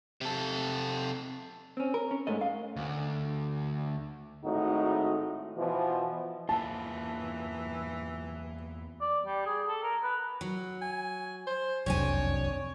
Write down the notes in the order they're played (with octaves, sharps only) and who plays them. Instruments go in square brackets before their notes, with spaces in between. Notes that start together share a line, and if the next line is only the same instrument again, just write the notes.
[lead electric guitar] C3 A4
[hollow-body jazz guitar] C4 C#4
A#4
C#4
G#2 A3 D#5
F5
[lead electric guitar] D2
[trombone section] G#1 A2 D#4 F#4
B2 E3 F3
[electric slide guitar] E2 A#3 F4 [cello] E3 [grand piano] A5
[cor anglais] D5
G3
G#4
A4
A#4
B4
[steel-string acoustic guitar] F#3
[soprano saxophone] G#5
C5
[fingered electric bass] F#1 C2 F3 [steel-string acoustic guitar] F2 D4 G#5 [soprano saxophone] C#5